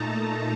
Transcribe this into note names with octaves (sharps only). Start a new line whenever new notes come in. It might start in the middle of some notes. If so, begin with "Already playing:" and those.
Already playing: A#2 A3 D#4 A5 A#5
A5